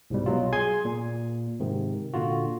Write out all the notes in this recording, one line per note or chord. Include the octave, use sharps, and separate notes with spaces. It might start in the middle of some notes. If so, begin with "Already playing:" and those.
C2 G#2 B2 G3
B2 F#3 F4
G#4 G#5 C6 G#6
A#2
G#2 C3 D#3
A#2 D3 F4 F#4